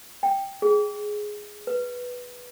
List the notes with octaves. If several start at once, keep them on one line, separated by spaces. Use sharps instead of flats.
G5
G#4
B4